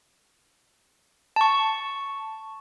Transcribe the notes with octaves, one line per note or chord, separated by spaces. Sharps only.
A5 C#6